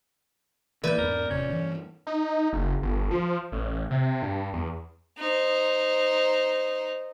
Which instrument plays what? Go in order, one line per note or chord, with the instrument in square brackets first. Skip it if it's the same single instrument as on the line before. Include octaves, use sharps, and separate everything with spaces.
[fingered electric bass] E3 A#3 [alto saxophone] E4 [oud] B4 [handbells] D5 G6
[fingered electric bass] E2 G#2 [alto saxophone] A#4
[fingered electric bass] E1 A2 C3 [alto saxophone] C#4
[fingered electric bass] G2 E3
[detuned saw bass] D#4
F#1
G1
F3
A1
C3
G2
E2
[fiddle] D#4 C5